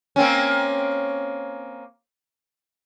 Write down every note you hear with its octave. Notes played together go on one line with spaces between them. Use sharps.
A#3 C4 C#4